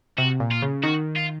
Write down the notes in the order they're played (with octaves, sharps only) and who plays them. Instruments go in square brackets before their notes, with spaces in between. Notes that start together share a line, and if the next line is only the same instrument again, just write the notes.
[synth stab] C3 [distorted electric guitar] F#4
[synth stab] A#2
[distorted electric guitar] F4
[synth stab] C#3
[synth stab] D#3 [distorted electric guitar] F#4
[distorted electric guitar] F4